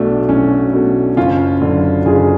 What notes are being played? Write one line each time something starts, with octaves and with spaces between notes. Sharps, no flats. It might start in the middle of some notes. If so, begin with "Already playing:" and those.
Already playing: B1 B2 A3 D4
B1 C#4
B2 A3
F#1 C#4 F4
F#2 D3 F#3
F#1 F4 G#4